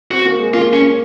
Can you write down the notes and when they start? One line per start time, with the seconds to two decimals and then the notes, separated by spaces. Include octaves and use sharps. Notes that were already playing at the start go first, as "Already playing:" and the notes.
0.11 C4 F#4
0.25 A#3
0.39 G#3
0.53 A#3 F4
0.73 C#4